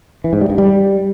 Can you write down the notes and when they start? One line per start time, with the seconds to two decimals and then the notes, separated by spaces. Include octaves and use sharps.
0.24 E3
0.33 G#2
0.41 G3
0.50 G2
0.58 G3